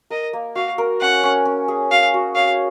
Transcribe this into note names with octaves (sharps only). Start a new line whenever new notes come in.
A#4 D#5
A#3
F#4 F5
A#4
C#4 F#5
C#4
C#4
G#4
F#4 F5
F#4
C#5 F5